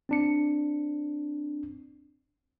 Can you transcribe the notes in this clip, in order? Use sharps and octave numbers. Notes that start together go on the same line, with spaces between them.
C4 D4 C#7